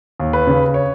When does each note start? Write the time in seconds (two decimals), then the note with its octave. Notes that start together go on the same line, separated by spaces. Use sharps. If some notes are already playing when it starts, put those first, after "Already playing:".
0.20 D#2
0.33 B4
0.47 C#3
0.74 C#5